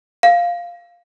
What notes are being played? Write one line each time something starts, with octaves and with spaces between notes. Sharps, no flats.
F5